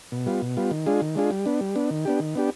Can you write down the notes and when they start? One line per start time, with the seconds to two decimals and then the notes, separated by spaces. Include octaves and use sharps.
0.12 B2
0.26 G3 B3 F4
0.42 B2
0.57 G3 B3 F4
0.71 D#3
0.86 G#3 D4 F4 G#4
1.01 D#3
1.16 G#3 D4 F4 G#4
1.31 G3
1.46 B3 D4
1.61 G3
1.75 B3 D4
1.91 D#3
2.05 B3 D4 G4
2.20 D#3
2.35 B3 D4 G4